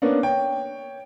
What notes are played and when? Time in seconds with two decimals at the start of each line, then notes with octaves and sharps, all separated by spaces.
0.02 A#3 B3 C#4 D4
0.23 C#5 G5